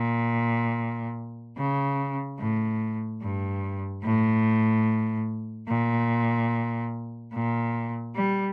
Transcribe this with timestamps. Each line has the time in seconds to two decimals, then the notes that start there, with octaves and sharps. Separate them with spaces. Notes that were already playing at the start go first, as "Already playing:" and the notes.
Already playing: A#2
1.57 C#3
2.39 A2
3.22 G2
4.03 A2
5.68 A#2
7.34 A#2
8.15 G3